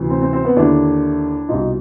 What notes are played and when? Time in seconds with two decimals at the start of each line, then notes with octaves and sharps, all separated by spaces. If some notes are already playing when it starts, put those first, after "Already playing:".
Already playing: D2 C3 E3
0.10 C4
0.21 C4
0.33 C4
0.45 B3
0.56 D#2 D3 D4 E4
1.49 C2 B2 D#4 F4